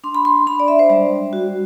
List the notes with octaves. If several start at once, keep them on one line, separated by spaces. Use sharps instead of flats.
D4 C6
B5
C6
D4 B5
D5
E5
C5
G3 D5
F#4